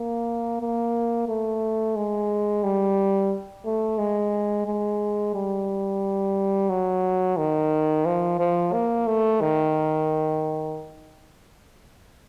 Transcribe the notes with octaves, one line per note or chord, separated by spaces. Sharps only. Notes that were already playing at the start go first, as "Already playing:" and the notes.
Already playing: A#3
A#3
A3
G#3
G3
A3
G#3
G#3
G3
F#3
D#3
F3
F3
A#3
A3
D#3